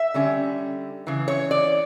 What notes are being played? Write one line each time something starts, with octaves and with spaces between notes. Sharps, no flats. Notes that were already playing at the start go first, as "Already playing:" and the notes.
Already playing: E5
D3 G3 C#4
C#3 E3
C#5
D5